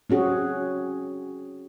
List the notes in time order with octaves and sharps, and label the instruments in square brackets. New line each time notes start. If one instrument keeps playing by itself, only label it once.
[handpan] C4 C#4 F#4 G#4